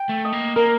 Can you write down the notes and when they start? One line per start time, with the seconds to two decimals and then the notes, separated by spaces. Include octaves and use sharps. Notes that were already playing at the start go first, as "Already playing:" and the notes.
Already playing: G5
0.09 A3
0.25 D#5
0.33 A#3
0.56 A#3 A#4